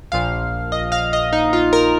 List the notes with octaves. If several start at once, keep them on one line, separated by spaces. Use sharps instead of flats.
A#1 A#2 F3 F5
D#5
F5
D#5
D#4
F4
A#4